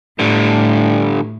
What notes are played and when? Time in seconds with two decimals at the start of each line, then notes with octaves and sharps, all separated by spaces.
0.19 A2 D3 G3